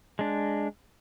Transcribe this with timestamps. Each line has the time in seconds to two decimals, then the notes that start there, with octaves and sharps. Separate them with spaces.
0.19 G#3 D4